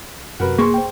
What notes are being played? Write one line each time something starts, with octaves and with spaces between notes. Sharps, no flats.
F#2 C3 F#4 A#4 B4
A#3 G#4 C6 C#6
C5 G5